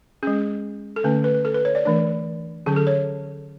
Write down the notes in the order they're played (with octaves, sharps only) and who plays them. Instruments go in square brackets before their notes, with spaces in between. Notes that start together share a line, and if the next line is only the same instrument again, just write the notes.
[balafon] G#3 C#4 G#4
A4
D3 A3 C#4 B4
B4
B4
A4
B4
C#5
D5
E3 A3 D4 D5
D3 F#3 C#4 G#4
A4
C#5